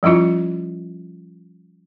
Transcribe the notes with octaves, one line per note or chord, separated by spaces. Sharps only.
F3 G3 C#4 E4 F4